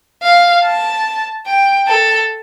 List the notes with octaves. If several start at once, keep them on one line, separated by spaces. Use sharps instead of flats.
F5
A5
G5
A4